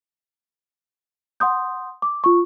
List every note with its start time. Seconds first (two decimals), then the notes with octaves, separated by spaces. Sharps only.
1.40 F#5 C6 D#6 G6
2.02 D6
2.24 F4 C#6